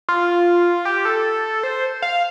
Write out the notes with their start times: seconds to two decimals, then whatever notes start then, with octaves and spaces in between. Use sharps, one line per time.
0.09 F4
0.85 G4
1.05 A4
1.63 C5
2.02 F5